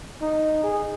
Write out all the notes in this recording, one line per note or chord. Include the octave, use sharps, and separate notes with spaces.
D#4
G#4